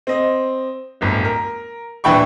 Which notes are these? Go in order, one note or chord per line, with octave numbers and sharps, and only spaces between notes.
C4 D#5
D1 G1
A#4
D#1 E3 D4 G5 B5 C#6